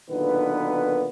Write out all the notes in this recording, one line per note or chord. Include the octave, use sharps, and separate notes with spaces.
B1 A#2 D3 D#3 B3 B4